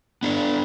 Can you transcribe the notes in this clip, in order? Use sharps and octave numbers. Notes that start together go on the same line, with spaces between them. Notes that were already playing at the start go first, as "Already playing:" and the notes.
B3 D4 A4 D5